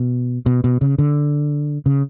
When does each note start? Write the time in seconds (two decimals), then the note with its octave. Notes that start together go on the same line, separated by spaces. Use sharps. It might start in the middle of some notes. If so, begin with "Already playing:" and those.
Already playing: B2
0.46 B2
0.64 B2
0.81 C#3
0.99 D3
1.86 C#3